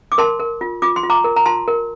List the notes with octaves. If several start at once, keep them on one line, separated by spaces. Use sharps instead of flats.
D6
A#4 A5 C6
A#4
F4
F4 D6
C6
F4
A#5 D6
A#4
A#5
F4 A5 C6
A#4